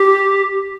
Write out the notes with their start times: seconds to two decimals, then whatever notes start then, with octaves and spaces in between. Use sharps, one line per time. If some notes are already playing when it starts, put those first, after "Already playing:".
Already playing: G4